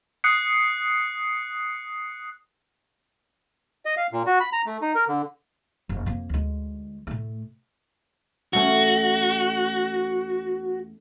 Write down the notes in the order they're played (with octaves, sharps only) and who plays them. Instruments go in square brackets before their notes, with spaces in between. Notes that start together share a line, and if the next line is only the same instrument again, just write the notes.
[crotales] D#6 F#6 C7 C#7
[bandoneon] D#5
F5
A#2
F#4
B5
A#5
A3
D#4
A#4
D3
[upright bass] F#1
F2 A#3
D2 G#3
A2 A3
[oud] E2 A3 C#4 [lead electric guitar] F#4